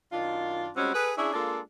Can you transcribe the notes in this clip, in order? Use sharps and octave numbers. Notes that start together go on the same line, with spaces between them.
F#2 D#3 D4 F4
G3 G#3 C4 C#4 F#4
G#4 A4 B4
C#4 D4 E4 G#4
G#3 A#3 D4 F4 A4